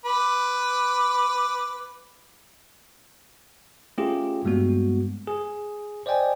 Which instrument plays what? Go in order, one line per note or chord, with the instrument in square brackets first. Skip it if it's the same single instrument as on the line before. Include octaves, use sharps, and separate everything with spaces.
[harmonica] B4 D6
[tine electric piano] A3 C#4 F4 G4 G#4
G2 G3 G#3 A#3 B3 F#4
G#4
C5 D5 D#5 G5 G#5